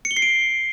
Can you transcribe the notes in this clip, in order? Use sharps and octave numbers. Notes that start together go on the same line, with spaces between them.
C#7
G7
C7
D7